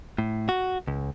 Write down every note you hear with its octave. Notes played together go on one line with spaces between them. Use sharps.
A2
F#4
C#2